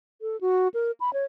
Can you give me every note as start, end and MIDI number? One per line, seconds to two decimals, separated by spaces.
0.22 0.40 69
0.41 0.68 66
0.74 0.91 70
1.00 1.13 83
1.13 1.25 73